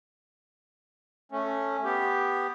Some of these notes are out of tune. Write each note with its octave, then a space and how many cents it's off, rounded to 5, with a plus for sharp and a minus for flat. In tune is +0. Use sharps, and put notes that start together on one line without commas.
A3 +0 C#4 -5
B3 +0 G4 +0